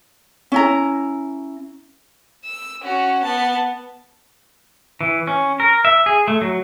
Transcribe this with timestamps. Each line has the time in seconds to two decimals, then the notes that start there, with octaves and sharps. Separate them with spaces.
0.52 C#4 E4 A#5
2.45 E6
2.82 C#4 F#4
3.24 B3 A5
5.01 E3
5.27 C#4
5.60 A#4
5.85 E5
6.06 G#4
6.28 A3
6.42 F#3